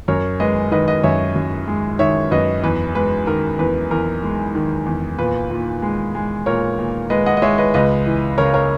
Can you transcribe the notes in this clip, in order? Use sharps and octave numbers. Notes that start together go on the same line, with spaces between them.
F#2 A#4 C#5
G#3 B4 D#5
D#3 B4 D#5
B4 D#5
F#2 C#5 E5
F#2
G#3
D#3 C#5 E5
F#2 B4 D#5
E2 B4
G#3 B4
D#3 A#4
E2 B4
E2 A#4
G#3
D#3
E2
A#2 B4
A#2
G#3
G#3
A#2 A#4 C#5
A#2
G#3 B4 D#5
D#5 F#5
D#5
G#3 C#5 E5
B4 D#5
C#2 B4 D#5
E3
C#3 A#4 C#5
A#4 C#5